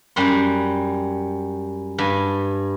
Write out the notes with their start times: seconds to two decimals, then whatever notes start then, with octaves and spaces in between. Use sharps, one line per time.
0.16 F#2 G3 C6
1.98 G2 G#5